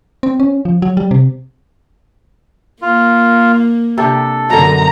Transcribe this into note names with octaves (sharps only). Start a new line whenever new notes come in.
C4
C#4
F3
F#3
G3
C3
A#3 F4
C3 D4 G4 A4
F#2 B2 D3 A#5